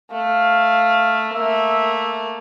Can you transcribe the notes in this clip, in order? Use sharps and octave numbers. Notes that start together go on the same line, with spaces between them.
A3 F5
A3 A#3 E5